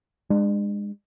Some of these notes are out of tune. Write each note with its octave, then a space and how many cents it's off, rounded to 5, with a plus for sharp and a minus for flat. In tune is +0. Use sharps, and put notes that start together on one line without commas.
G#3 -20 D4 +40